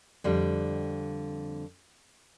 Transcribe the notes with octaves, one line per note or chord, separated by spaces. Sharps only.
F2 D3 G3